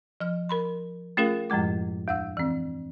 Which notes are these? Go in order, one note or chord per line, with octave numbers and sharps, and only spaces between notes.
F3 F6
A#4 B5 C6
A3 C#4 F4 G#4 A#4 F5
F#2 A2 F3 G#3 D6
E2 F#5 E6
E3 C4